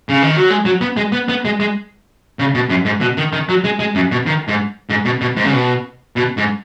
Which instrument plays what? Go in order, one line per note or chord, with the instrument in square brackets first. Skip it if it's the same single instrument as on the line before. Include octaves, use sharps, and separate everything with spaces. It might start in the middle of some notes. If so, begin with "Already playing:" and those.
[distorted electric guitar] C#3
D#3
F#3
G#3
F#3
B3
G#3
B3
B3
G#3
G#3
C#3
B2
F#2
G#2
B2
D#3
D#3
F#3
G#3
G#3
F#2
B2
D#3
G#2
G#2
B2
B2
G#2
C#3
B2
B2
G#2